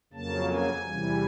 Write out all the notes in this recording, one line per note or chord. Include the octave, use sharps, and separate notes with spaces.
F2 C#3 F#3 A#3 A5
G#5
E2 C3 E3 G3